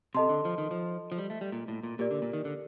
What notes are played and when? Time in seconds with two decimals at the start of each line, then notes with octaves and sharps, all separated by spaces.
0.14 C3 A4 D#5 A5 C6
0.29 D3
0.45 F3
0.58 D#3
0.71 F3
1.12 F3
1.18 G3
1.30 A3
1.41 G3
1.52 A#2
1.68 A2
1.83 A#2
1.99 A#2 G4 A#4 D5
2.11 D3
2.22 A#2
2.33 D#3
2.45 D3